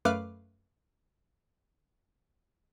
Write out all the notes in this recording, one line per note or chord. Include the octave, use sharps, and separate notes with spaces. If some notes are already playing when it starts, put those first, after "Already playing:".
F#2 A3 B4 F5 D6 F6